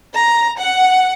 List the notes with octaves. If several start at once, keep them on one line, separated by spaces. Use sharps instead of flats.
A#5
F#5